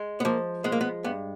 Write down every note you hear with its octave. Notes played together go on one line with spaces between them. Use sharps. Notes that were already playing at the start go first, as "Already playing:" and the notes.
Already playing: G#3
B3
F3 A#3
G#3 B3
A#3
B3
G2 B3